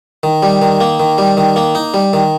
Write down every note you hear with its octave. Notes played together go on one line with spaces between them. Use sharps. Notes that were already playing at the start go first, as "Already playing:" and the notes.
D#3
G3
D#3
A#3
D#3
G3
D#3
A#3
D#4
G3
D#3